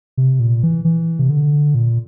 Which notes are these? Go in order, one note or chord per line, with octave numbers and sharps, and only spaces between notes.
C3
A#2
E3
E3
C3
D3
A#2